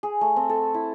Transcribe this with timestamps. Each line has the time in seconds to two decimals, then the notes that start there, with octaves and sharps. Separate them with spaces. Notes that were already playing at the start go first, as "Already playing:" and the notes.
0.03 G#4
0.21 A3
0.36 C4
0.50 A4
0.74 E4